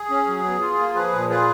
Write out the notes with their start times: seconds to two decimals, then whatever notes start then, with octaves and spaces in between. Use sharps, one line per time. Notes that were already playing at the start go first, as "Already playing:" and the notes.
Already playing: G#4
0.10 C#4
0.27 F#3
0.44 B2
0.61 F4
0.78 A#3
0.94 F3 G#4 B4
1.13 A#2
1.30 F4 G#4 B4